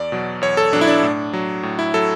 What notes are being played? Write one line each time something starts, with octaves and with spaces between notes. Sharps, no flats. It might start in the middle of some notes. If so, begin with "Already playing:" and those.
Already playing: E2 D5
B2 F#3
E2 C#5
A4
B2 F#3 D4
E4
D4
A2
F#3
A2
E4
F#3 A4